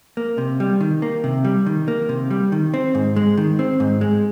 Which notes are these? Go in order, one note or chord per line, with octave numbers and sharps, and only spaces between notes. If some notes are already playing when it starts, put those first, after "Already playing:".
A#3
C3
G3
D#3
A#3
C3
G3
D#3
A#3
C3
G3
D#3
C4
G#2
G#3
D#3
C4
G#2
G#3